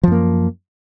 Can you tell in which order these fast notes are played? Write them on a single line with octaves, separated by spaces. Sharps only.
F3 F#2 A#3